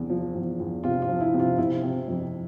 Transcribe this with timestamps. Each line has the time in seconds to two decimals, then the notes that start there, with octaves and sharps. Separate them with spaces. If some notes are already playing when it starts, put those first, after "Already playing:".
Already playing: E2 C3
0.10 F3
0.35 E2
0.60 E2
0.84 C3 F4
1.02 F4
1.08 F3
1.21 E4
1.34 C3
1.40 F4
1.58 C3 E4
1.83 C3
2.08 F2